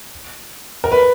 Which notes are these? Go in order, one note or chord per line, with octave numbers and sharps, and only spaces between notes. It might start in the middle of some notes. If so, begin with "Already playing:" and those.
A#4
B4